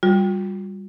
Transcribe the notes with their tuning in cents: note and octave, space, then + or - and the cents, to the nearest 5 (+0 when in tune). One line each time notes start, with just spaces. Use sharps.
G3 +0 F4 +45